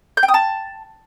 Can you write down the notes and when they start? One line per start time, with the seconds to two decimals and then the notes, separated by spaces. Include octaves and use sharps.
0.17 G6
0.23 G5
0.28 D#6
0.34 A5